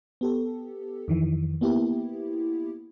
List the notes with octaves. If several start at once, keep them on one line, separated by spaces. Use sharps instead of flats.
B3 G4 A4
F2 D#3 E3
A#3 B3 E4 G4